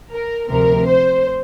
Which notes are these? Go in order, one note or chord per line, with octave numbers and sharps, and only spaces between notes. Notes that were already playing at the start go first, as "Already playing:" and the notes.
A#4
D2 C3 F3 A#4
C5